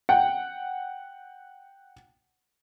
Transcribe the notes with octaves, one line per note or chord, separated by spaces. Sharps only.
F#5 G5